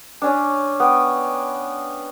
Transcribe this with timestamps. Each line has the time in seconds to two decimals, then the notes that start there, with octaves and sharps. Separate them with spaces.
0.22 C#4 D4
0.80 B3 G5